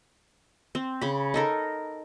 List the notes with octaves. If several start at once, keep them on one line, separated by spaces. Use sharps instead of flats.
C4
C#3 B5
D#4 A4 A#4